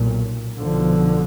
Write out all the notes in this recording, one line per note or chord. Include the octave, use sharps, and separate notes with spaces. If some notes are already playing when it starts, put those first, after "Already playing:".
Already playing: B1 A#2
B1 B2 D3 F3